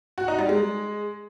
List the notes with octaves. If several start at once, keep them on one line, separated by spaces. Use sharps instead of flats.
F#4
D#4
G3
G#3